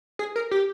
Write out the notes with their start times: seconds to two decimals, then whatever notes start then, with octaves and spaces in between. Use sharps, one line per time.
0.19 G#4
0.36 A#4
0.51 G4